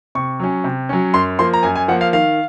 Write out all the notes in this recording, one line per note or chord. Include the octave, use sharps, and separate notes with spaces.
C3 C#6
F#3 C#4
C3
F#3 C#4
F#2 C6
F3 A#3 C6
A#5
F#2 G#5
G#5
F3 A#3 F#5
F5
D#3 F5